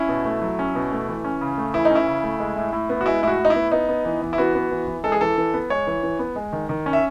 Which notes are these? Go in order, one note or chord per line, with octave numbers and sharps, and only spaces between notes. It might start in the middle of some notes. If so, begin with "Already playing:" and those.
Already playing: C#4 E4
B2
A3
F#3
C#4
B2
A3
E3
C#4
C#3
A3
E3 E4
D#4
C#4 E4
C#3
A3
G#3
A2
A2
B3
F#4
G#3 E4
A2 E4 F#4
A2
D#4
E4
B3
B3 D#4
B3
E3
E3
E4
B3 F#4
B3
E3
E3
G#3 A4
G#4
E3 A4
E3
B3
G#3 C#5
E3
E3
B3
G#3
D#3
D#3
C#4
E5